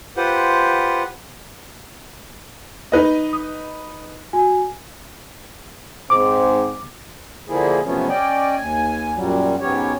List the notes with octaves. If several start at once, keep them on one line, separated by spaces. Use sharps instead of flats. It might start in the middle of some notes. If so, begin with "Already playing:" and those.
F4 G4 B4 C5 F#5
D#4 B4 D#5
D#6
F#4 G#5
G#2 C4 D6
D3 F3 A#3 E4 G#4
C3 F3 F#3 A3 B3 C#4
C#4 D5 D#5 G5
D#2 G#5
F#2 A#2 F#3 G3
G#2 F#3 B3 C#4 G4 C#5